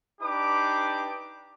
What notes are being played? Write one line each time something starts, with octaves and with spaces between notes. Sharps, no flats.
D4 D#4 G4 B4 D6